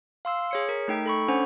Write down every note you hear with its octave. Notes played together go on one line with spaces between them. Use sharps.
F5 C6 E6
G#4 C#5 C#7
A#4
A3 D#4 G5
A4 B5 C#6
C#4 D4 C5 F#5